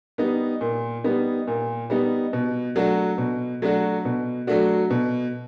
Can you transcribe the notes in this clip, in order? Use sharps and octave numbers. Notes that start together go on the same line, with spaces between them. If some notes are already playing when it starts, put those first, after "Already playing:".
G3 B3 D#4
A#2
G3 B3 D#4
A#2
G3 B3 D#4
B2
F#3 A3 D4 F#4
B2
F#3 A3 D4 F#4
B2
F#3 A3 D4 F#4
B2